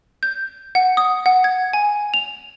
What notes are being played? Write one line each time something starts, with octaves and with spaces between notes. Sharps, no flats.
G6
F#5
D#6
F#5
G#6
G#5
F7